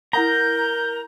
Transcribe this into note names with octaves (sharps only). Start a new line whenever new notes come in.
E4 A#4 F#5 A#5 D#6 G6